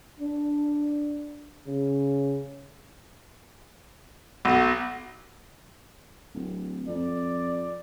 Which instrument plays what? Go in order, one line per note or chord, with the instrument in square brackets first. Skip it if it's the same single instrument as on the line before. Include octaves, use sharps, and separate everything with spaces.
[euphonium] D4
C#3
[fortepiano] B1
[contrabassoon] D1
[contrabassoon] F2 [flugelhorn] D5